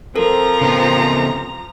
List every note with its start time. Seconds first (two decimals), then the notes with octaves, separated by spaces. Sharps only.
0.16 F3 C4 A4 A#4 A#5
0.61 C#3 B3